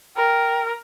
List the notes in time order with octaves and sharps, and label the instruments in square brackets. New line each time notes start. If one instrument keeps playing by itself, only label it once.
[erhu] A#4 [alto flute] G5